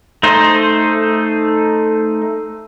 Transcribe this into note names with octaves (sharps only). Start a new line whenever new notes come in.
A3 D#4 C5